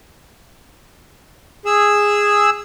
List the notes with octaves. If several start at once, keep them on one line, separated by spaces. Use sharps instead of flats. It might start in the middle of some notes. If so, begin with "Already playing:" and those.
G#4 E6